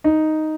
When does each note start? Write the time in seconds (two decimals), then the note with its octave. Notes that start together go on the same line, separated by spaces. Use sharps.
0.04 D#4